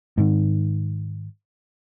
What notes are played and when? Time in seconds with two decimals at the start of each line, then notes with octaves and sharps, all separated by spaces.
0.18 G#2 D#3